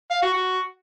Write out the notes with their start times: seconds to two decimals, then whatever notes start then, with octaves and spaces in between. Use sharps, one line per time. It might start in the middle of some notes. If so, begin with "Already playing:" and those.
0.10 F5
0.22 F#4
0.33 F#4